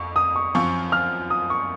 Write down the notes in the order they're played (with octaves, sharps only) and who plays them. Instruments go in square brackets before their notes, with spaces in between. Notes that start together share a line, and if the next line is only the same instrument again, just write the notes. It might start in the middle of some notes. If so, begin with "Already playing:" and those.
Already playing: [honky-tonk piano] F2 [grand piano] C#6
[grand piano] D#6
C#6
[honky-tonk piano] F#2 F3 C4 F4 [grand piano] C#6
[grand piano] F6
D#6
C#6